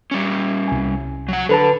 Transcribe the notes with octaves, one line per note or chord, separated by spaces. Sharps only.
G3 C#4
C2 G#5
F#3 F#5
D3 A4 B4 A5